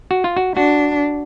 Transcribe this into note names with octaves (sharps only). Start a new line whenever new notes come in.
F#4
F4
F#4
D4 F#4